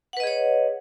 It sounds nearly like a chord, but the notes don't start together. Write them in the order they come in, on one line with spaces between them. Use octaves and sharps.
F#5 B4 D#5 G#4 C#5